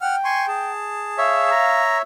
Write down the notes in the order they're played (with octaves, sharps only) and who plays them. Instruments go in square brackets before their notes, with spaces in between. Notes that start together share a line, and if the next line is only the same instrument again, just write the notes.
[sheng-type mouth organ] F#5 F6 [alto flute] G5
[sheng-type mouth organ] G#5 C6 C#6
G#4 A5
[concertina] C#5 E5 [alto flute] F5
[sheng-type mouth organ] A#5